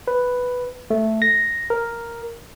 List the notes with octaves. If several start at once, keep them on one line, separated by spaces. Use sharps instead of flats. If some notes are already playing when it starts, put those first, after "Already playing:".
B4
A3
A#6
A#4